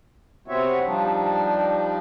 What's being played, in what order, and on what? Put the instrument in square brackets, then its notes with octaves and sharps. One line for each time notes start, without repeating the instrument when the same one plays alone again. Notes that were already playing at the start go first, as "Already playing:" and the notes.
[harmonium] C3 B3 C4 F#4 C#5 E5
F3 G3 D4 D#4